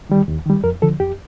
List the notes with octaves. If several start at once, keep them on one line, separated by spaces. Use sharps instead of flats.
D#3 G3
D#2
D#3 G3
F2 A#4
D3 F3 A4
F2 G4